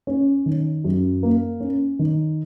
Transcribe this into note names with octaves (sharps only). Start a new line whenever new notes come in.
C#4
D#3
F#2
A#3
C#4
D#3